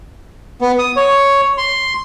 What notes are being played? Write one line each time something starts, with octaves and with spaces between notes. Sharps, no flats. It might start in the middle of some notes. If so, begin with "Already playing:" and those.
B3
D#6
C#5
C6